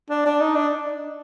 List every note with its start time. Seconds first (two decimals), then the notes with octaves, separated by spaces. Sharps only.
0.10 D4
0.26 D4
0.41 D#4
0.56 D4